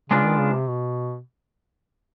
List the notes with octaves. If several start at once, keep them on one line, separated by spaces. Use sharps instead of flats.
C#3 G#3 B3 D4 F4
D#3
C#3
C3
B2